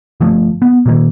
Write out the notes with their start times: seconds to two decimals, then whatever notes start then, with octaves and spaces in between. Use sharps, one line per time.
0.20 G1 F3 A3
0.62 B3
0.86 A#2 D#3 A#3